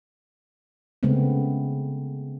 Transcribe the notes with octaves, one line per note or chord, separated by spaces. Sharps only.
C#3 G#3 A3 B3 C4